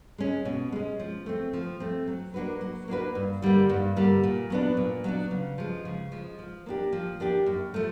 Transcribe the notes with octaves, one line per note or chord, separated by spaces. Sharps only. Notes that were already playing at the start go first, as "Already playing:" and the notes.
G#3 C#4
B2
G#3 C#4
F3
A3 C4
F3
A3 C4
F#3
A#3 D4 F#4 B4
F#3
A#3 D4 F#4 B4
G2
D3 G3 A#3
G2
D3 G3 A#3
A#2
F#3 B3 D4
A#2
F#3 B3 D4
C#3
F3 G#3
C#3
F3 G#3
F3
A#3 D4 G4
F3
A#3 D4 G4
F#2
F3 A3